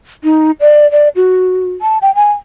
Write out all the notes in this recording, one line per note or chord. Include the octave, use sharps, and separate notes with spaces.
D#4
D5
D5
F#4
A5
G5
G#5